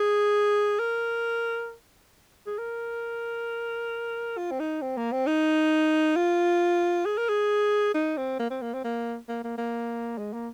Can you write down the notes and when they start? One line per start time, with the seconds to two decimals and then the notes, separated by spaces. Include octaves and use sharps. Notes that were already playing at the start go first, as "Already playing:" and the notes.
Already playing: G#4
0.79 A#4
2.47 G#4
2.58 A#4
4.38 F4
4.51 C4
4.60 D#4
4.82 C4
4.97 A#3
5.12 C4
5.27 D#4
6.16 F4
7.06 G#4
7.18 A#4
7.29 G#4
7.94 D#4
8.17 C4
8.39 A#3
8.50 C4
8.62 A#3
8.74 C4
8.84 A#3
9.29 A#3
9.44 A#3
9.58 A#3
10.18 G#3
10.33 A#3